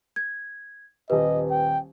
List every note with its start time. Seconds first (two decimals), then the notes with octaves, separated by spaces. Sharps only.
0.16 G#6
1.10 D#1 G4 B4 D#5
1.51 G5